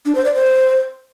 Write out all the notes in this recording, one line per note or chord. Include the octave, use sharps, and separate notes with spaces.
D4
C5
D5
C5